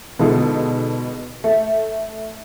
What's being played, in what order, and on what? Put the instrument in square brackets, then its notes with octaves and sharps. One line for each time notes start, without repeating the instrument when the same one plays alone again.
[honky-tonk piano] B2 D3 G#3 D#4 F4 A4
A3